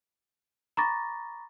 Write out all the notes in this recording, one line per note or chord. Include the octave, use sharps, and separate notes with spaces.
A#5 B5 C#6 D6 A6 A#6